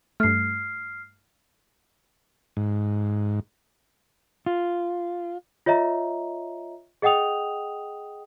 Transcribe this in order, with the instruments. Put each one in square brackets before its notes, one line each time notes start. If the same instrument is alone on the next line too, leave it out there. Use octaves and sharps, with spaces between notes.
[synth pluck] G2 A3 [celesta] F6 C7
[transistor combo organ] G#2
[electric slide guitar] F4
[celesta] F4 C#5 D#5 E5 A#5
G#4 D#5 F#5 G5 D#6 F7